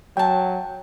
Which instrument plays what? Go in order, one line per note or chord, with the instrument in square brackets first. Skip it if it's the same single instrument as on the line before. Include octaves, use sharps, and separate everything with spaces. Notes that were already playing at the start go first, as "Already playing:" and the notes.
[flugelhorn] F#3 [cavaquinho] E5 A5 [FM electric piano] G5